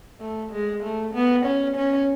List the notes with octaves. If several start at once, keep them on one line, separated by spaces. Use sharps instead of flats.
A3
G#3
A3
B3
C#4
C#4